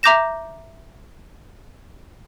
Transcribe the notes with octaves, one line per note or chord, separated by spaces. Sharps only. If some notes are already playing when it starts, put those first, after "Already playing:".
E5 A#5 D6 G6 A#6 E7